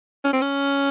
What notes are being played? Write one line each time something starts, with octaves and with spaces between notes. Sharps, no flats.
C#4
C4
C#4